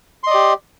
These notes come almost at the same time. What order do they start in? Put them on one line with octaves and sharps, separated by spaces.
C6 D#5 D5 G4